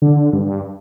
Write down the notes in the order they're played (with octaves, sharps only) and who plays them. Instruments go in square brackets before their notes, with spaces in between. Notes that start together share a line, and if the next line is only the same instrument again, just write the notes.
[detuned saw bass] D3
G2